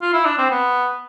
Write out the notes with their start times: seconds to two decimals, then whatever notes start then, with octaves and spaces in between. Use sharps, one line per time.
0.02 F4
0.13 E4
0.26 D4
0.38 C4
0.50 B3